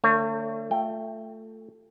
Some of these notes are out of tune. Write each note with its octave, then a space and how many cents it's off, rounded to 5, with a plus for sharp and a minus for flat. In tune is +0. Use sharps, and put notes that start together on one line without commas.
D3 +0 A3 +40 C#5 +0
A3 +10 F4 +0 G5 +0